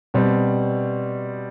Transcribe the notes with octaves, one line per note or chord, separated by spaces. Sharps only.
B2 G3 C4